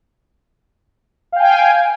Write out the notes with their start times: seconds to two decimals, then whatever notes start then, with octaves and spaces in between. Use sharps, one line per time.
1.32 F5
1.36 G5
1.40 G#5